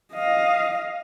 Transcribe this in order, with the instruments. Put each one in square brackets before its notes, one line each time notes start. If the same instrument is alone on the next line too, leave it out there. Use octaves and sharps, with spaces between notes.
[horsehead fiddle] D#5 F5